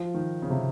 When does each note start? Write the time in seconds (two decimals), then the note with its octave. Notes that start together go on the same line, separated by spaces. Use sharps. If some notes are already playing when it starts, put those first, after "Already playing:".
Already playing: F3
0.14 D#3
0.42 C#3
0.50 C3